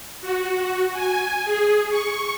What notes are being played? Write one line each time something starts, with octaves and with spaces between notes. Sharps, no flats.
F#4
G#5
G#4
C#6